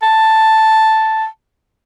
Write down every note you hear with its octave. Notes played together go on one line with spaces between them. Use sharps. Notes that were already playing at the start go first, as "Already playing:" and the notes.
A5